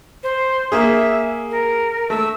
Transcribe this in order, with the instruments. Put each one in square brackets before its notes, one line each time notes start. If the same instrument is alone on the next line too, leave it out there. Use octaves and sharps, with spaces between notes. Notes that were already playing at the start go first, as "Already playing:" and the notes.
[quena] C5
[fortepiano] A#3 G#4 [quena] E5
[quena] A#4
[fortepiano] A3 [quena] E6